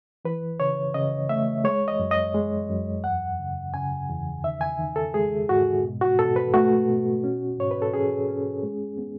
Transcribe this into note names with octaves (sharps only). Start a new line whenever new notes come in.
E3 B4
C#3 C#5
C#3 D#5
A3 E5
G#3 C#5
D#5
F#2
D#5
G#3
F#2
E2 F#5
C#3
C#3 G#5
E2
D#3 E5
G#5
D#3
A4
G#3 G#4
G#2 F#4
B2
F#4
B2 A4
B4
A3 F#4
B2
C#4
G#2 C#5
B4
A4
C#4 G#4
C#4
G#3
B3